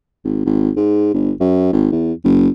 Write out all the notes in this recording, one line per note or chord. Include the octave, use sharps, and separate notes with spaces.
G#1
G#1
G#2
G1
F#2
G#1
E2
F#1